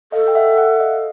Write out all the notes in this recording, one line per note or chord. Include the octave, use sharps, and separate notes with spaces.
A4 D#5 F5
G5
E5 F#5
E5 F#5
D#5 F5